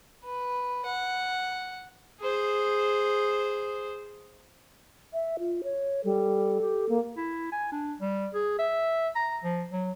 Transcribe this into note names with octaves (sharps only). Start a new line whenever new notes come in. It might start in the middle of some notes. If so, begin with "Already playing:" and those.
B4
F#5
G#4 C5
E5
F4
C#5
G3 A4
G4
A#3
E4
G#5
D4
G3
G#4
E5
A#5
F3
F#3